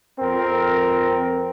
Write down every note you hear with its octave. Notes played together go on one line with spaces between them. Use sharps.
F2 C4 A#4